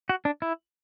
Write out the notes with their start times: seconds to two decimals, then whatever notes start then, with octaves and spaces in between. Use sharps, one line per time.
0.09 F#4
0.25 D4
0.42 E4